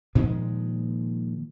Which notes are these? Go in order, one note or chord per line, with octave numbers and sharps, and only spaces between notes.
A#2 D#3 F3 G#3